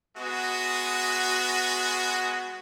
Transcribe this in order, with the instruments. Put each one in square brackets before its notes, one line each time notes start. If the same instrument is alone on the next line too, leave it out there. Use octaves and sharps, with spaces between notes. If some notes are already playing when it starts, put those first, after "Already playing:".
[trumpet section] G#3 B3 F#4